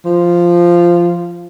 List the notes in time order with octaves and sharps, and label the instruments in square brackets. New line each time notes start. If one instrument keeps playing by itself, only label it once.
[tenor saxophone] F3